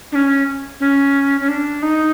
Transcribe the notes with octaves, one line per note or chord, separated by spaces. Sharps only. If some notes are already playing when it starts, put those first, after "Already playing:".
D4
C#4
C#4
C#4
D4
D#4